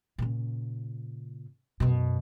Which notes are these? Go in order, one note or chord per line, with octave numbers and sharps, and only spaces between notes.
A#2 C#3
F#2 B2